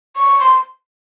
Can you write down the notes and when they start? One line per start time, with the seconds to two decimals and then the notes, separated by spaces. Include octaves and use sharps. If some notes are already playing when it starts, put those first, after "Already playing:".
0.16 C#6
0.40 C6